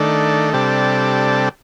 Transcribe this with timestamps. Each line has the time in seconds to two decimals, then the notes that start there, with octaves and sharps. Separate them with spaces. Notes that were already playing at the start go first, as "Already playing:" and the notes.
Already playing: D#3 A3 D4
0.53 C3 G3 D4 A4